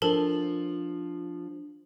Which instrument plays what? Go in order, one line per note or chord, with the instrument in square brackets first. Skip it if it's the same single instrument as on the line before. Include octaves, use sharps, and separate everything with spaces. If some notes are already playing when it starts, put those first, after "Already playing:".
[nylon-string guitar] F3 [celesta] D4 F#7 [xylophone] A4 A#4 A5